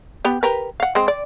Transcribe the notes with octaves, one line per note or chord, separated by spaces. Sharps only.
B3 G4
G4 A#4 B4
F5 F#5
G#3 C4
D5